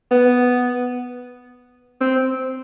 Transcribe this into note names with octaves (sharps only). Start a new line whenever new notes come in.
B3
C4